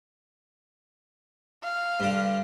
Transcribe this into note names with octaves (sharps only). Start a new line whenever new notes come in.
F5
G2 D3